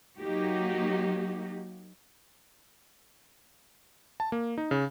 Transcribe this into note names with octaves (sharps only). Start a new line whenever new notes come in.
F#3 A#3 D#4 F#4 G4
A5
A#3
D#4
C#3